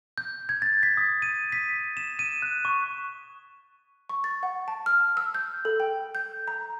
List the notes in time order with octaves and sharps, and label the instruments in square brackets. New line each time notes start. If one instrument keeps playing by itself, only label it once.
[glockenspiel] G6
G#6
A6
B6
D#6
D#7
B6
E7
D#7
F#6
C#6
[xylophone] C#6
A6
F#5
A5
F6
E6
G6
A4
G5
G6
A#5